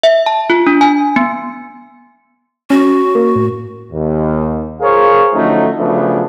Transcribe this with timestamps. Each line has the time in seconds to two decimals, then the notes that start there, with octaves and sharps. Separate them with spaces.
0.03 E5
0.26 A5
0.50 F4
0.67 D4
0.81 G#5
1.16 B3
2.70 C#4 F#4
3.15 A#3
3.36 A2
3.92 D#2
4.81 F4 G#4 A#4 C5 C#5 F5
5.34 D3 F3 F#3 A3 C#4 D#4
5.78 C#3 F3 F#3 A3 B3 D4